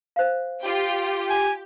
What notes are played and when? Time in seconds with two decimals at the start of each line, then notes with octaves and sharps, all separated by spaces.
0.16 C5 F5
0.62 F4 G4 G5
1.30 G#5